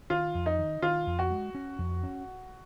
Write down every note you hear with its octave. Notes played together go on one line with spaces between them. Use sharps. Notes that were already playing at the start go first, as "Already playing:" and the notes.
D#3 F4
F2
D#4
D#3
D#3 F4
F2
F#4
G#3
C#4
F2
C#4